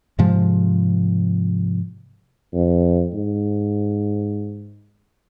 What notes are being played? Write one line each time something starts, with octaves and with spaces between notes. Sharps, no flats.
G#2 C3 F3 G#3
F2
G#2